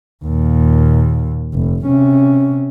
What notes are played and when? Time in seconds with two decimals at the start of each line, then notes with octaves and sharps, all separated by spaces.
0.25 D#2 A#2
1.54 F1
1.86 C3 C#4